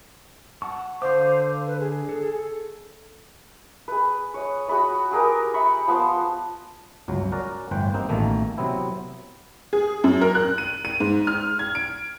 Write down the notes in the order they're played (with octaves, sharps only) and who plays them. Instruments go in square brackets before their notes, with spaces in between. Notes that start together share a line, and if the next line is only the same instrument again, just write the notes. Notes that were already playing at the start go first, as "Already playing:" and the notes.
[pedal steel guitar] F#5 A5 C#6
[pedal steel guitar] D3 F5 D6 [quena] C5
[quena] B4
G#4
[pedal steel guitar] A4
[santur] G#4 B4
C#5 D#6
F#4 G#4 B5 D#6
G4 G#4 A#4 B4
E5 B5 C#6
F3 B3 A5 C6
[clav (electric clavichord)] G1 C#2 F#3
C#4 F#4 A#4 D5
G1 A2 E3 C5 F#5 G5
G3 A#3 C4 D#4
A1 B2 D#3 A3 A#3
C3 F#3 B3 C4 E4
[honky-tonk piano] G#4
F#2
A#4
F#6
D#7
D#7
G#2
F6
G#6
D7